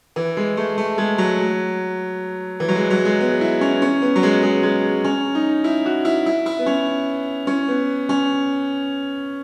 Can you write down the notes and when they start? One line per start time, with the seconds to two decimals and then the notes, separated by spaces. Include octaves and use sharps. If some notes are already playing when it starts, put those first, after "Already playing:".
0.16 E3
0.37 G#3
0.57 A3
0.78 A3
0.98 G#3
1.18 F#3
2.60 E3
2.68 F#3
2.76 G#3
2.90 F#3
3.05 G#3
3.20 B3
3.41 E4
3.61 C#4
3.82 C#4
4.02 B3
4.16 F#3
4.23 G#3
4.43 G#3
4.63 G#3
5.04 C#4
5.35 D#4
5.64 E4
5.86 F#4
6.05 E4
6.26 E4
6.46 E4
6.59 B3
6.66 C#4
7.47 C#4
7.68 B3
8.09 C#4